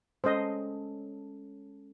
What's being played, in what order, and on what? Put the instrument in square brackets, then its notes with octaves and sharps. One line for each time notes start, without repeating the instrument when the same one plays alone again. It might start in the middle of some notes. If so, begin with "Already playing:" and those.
[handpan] G#3 C#4 A4 [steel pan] C5 D#5